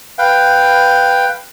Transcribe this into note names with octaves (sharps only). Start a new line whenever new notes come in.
B4 F5 G5